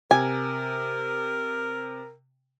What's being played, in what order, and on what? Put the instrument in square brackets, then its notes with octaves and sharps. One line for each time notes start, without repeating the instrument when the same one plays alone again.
[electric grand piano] C3 [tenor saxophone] A#4 [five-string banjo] G#5